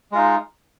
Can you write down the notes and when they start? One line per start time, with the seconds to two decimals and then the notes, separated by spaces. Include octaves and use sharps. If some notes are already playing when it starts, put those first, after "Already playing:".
0.12 G#3
0.15 F4
0.18 D#4